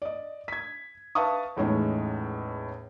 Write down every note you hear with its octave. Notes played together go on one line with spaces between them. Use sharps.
D5 D#5
G#6 B6
B4 E5 F5 A5 C#6 D#6
E2 A2 G#3 C#4 D#4